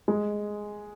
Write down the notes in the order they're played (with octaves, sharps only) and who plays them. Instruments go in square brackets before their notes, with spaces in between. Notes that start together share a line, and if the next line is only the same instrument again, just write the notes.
[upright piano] G#3